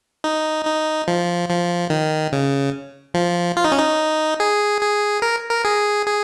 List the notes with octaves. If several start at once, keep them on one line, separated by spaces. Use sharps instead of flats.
D#4
D#4
F3
F3
D#3
C#3
F3
F4
D#4
C#4
D#4
G#4
G#4
A#4
A#4
G#4
G#4